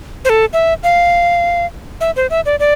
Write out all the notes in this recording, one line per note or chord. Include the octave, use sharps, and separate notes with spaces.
C5
A4
E5
F5
E5
C5
E5
D5
D5